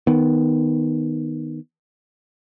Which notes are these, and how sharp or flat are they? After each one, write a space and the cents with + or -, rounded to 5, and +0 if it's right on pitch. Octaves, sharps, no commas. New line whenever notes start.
D#3 +0 B3 +0